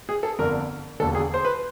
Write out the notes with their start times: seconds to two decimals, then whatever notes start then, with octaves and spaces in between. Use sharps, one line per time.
0.09 G#4
0.23 A4
0.39 G1 F2 D3 A#4
1.00 E1 D#2 D3 A4
1.15 G#4
1.34 C5
1.45 B4